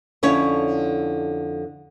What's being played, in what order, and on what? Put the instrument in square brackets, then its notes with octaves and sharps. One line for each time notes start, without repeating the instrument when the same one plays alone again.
[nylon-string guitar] F2 D3 C#4 E4 C#5